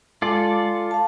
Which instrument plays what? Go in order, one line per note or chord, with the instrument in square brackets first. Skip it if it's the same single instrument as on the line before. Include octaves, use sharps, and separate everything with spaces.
[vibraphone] G#3 [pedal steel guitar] F4 A4 D5
[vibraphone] F5 A5